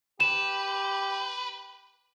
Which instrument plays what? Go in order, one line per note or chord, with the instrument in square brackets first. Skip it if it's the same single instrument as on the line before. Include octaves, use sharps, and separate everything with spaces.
[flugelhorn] G4 [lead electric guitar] B4 [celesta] E7